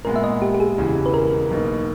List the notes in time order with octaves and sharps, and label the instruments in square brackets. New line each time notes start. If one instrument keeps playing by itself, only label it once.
[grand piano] A#2 G#3 B3 [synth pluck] A#4
[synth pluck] E5
D#5
G4
G4
G#4
[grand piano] E1 E2 C#3 E3
[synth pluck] B4
A#4
[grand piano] B1 B2 A#3 D#4